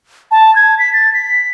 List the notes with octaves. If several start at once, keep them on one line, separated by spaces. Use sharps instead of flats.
A5
G#6
B6
A6
B6